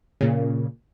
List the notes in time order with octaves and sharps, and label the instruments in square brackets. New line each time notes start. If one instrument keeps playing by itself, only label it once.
[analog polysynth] A#2 C#3